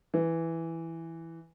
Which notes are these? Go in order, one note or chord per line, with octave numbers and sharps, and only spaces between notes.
E3